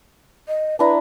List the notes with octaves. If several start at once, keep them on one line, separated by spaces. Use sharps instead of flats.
D#5
D4 E4 B4 A#5